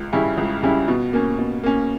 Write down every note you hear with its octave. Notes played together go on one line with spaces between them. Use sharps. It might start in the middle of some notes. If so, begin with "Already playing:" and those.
Already playing: C#2
C#3 G3 C#4 E4
C#2
C#3 G3 C#4 E4
B2
A#3 C#4
B2
A#3 C#4